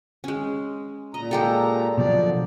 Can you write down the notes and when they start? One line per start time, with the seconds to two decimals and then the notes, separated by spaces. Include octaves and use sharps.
0.24 G#3 C#4
1.14 A#2 D#5 A#5
1.31 G#3 G4 A4
1.97 B2 D3 F3 F#3 D5